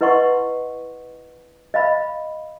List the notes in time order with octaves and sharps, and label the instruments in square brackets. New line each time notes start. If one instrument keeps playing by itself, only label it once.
[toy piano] E4 B4 D#5 F#5 C6 C#6
D#5 F5 B5